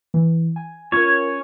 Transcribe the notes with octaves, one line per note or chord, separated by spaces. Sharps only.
E3
G#5
C#4 F4 A#4 C#5